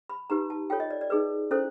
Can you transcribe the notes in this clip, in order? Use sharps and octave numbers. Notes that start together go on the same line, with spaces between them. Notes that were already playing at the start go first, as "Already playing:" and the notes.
B5
D#4 G4 B4 A#5
A5
F4 A4 C#5 G5
D#5
D5
D5
D#4 G#4 B4
C#4 E4 A4 C5